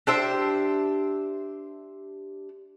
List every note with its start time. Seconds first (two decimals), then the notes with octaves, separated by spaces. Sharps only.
0.07 D4 G4 C5 E5